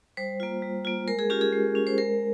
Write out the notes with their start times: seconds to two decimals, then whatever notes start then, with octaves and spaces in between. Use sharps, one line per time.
0.17 G3 C5
0.40 A#3 F4
0.62 G3
0.85 A#3 F4
1.08 G#3 A#4
1.19 G#4
1.30 C#4 F4 G4
1.41 G#4
1.53 G#3
1.75 C#4 F4
1.87 C5
1.98 G#3 A#4